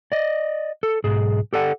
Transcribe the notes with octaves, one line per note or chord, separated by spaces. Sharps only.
D5 D#5
A4
B1 G#2 G#4
G4 A4 D5 F#5